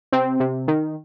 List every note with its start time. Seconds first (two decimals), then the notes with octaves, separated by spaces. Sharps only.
0.12 C3 C4
0.40 C3
0.68 D#3